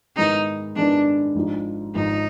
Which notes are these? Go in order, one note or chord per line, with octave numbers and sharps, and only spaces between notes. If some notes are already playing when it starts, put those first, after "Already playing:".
G#2 D#3 G#3 B3 D#4 E4
G#2 D#3 G#3 B3 D4 E4
G#1 G#2 F3
G#1 G#2 F3 D#4